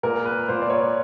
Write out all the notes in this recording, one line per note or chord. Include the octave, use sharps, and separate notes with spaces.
A#2 A#4
B4
A#2 C5
D5
C#5